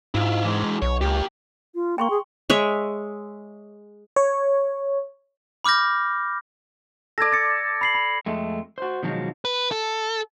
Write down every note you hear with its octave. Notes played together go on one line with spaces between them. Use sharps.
G#2 E4 F4
E3 G#3
B1 C#5
C#2 A#3 G4
F4
A#3 G5 C6 C#6
G#4
G#3 C#5 E5
C#5
B5 D6 F6 G6 A#6
A4 D5 G#6 A#6
A6 C#7
B5 C7 F#7
B5
F2 G#3 A3
F#4 C5
B2 D#3 F3 F#3 G#3
B4
A4